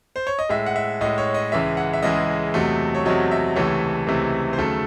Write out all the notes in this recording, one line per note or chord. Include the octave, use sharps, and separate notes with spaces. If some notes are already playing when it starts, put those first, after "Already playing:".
C5
C#5
D#5
A2 G#3 E5
F#5
E5
A2 G#3 D#5
C#5
D#5
C#2 C#3 E3 G#3 E5
F#5
E5
C#2 C#3 E3 G#3 D#5
E2 C3 F#3 A3
C#5
E2 C3 F#3 A3 D#5
E5
C#2 C3 E3 A3 C#5
C#2 C3 E3 A3
C5
D#2 C#3 F#3 A3 A4